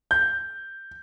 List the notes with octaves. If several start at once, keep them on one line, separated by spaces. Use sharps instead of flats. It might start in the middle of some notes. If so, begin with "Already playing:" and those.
G6